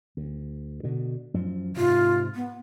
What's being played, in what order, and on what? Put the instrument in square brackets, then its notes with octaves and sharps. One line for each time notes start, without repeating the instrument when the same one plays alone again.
[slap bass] D2
B2 D3
F#2 F3
[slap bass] G#2 C3 [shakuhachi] F4
[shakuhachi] B3